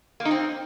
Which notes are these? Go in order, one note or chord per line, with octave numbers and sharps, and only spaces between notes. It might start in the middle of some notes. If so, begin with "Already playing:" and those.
A#3
D#4
C4